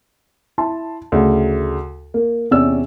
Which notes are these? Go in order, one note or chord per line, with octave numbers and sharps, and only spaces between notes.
E4 A5 C6
D2 C#3
A#3
E2 C3 C#4 D5 E6